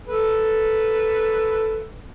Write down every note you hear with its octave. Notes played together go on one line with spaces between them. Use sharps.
A4 B4